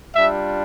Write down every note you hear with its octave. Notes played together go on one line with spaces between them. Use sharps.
G3 D4 F4 E5